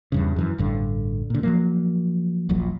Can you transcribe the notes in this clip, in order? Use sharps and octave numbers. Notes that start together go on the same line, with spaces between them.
E2 G2 C#3
F#2 D#3 E3
A1 G2 D3
A#2 D3
F3 F#3 A#3
D#1 A#1 A#2 F#3